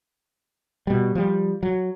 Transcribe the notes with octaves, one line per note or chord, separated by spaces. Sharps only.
B2 G3
F3 G3
F#3